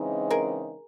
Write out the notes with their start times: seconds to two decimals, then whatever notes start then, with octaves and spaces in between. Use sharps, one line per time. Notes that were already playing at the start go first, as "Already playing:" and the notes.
Already playing: C#3 E3 G#3 C4 D#4
0.30 G#4 A#4